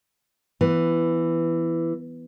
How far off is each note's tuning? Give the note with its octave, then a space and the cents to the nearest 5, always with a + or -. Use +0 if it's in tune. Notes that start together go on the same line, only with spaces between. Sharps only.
E3 +10 B3 +5